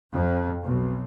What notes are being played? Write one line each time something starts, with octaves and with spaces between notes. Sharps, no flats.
F2
B1